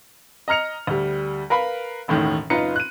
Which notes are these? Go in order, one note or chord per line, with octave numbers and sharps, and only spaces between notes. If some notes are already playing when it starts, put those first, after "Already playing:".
D#5 A#5 F6 C#7 F7
D2 G3
A#4 B4 F5 B5
E1 A1 A2 D#3
F#1 D#4 F4 B4 A#5 C#7
F#6 D#7